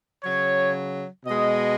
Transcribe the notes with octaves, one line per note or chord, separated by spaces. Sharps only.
C#3 F#3 C#5
B2 G#3 D#5